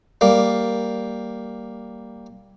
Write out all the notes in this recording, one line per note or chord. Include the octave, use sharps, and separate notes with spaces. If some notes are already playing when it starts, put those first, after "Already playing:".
G3 A#3